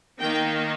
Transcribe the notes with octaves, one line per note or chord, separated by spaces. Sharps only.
D#3 A#3 D#4 G5